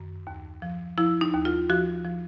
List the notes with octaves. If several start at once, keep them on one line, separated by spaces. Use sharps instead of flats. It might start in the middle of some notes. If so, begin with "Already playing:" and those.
Already playing: F#2 D#3
D#2
F3
F3 E4
D#4
D#2
F4
F3 F#4
F3